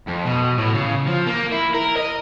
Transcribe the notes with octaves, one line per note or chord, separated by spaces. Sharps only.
F2
B2
A2
C#3
F3
A#3
E4
A#4
D#5